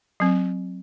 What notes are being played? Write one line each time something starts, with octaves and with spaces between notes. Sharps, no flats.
F#3 C4